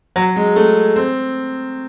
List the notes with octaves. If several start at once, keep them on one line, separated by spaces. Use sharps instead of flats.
F#3
G#3
A3
C4